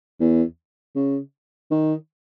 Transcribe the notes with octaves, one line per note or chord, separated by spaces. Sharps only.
E2
C#3
D#3